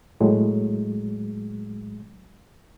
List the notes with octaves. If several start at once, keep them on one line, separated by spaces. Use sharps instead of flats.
A2 F#3 G#3